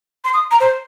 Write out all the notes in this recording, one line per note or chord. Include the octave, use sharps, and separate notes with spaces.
C6
D#6
A#5
C5